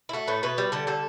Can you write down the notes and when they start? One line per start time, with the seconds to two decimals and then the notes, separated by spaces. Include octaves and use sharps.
0.09 E4
0.13 A3 F#4
0.28 A2 B4
0.43 B2 B4
0.58 G3
0.72 D3 A4
0.87 G3 A4